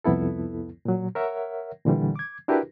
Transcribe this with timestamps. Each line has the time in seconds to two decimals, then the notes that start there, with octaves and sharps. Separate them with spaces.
0.04 C2 F2 B3 E4 A4
0.85 A#2 F#3
1.15 A#4 C#5 E5 F#5
1.85 A#2 D3 E3 G3
2.16 D6 G#6
2.48 D4 E4 F#4 G4 A#4 B4